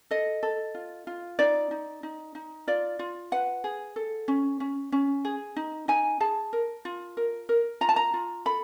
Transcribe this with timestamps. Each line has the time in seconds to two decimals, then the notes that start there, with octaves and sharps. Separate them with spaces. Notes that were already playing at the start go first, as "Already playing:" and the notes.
0.11 A4 D#5
0.43 A4
0.75 F4
1.07 F4
1.39 D#4 D5
1.71 D#4
2.03 D#4
2.35 D#4
2.67 F4 D5
2.99 F4
3.32 B4 F#5
3.64 G#4
3.96 A4
4.28 C#4
4.60 C#4
4.92 C#4
5.25 G#4
5.56 D#4
5.88 D#4 G#5
6.20 G#4 A5
6.53 A#4
6.85 F4
7.17 A#4
7.49 A#4
7.81 F4 A#5
7.89 A5
7.96 A#5
8.14 F4
8.46 A4 B5